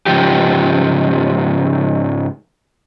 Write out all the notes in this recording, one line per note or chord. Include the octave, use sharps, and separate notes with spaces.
G#2 C#3 F3 G4